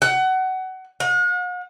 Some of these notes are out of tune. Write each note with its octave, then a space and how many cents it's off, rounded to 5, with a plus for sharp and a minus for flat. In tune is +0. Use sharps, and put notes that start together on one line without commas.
F#5 +25
F#5 -45